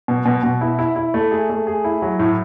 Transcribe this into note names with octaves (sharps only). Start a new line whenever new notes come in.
B2
B2
B2
E4
E4
E4
A3
G#4
A3
G#4
E4
F#3
A2